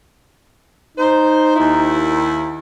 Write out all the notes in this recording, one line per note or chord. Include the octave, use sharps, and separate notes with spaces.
D#4 C5
D#2 E4